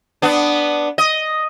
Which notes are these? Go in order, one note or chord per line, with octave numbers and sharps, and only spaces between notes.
B3 D4
D#5